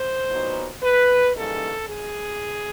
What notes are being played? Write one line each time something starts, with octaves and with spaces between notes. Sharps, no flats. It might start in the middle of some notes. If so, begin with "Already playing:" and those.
Already playing: C5
A#2 F#3 B3 D#4
B4
C#3 E3 G3 A#3 D#4 A4
G#4